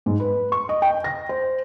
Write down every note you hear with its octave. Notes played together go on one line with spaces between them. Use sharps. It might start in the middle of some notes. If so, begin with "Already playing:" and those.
G#2
B4
C#6
D#5
G5
A#6
C5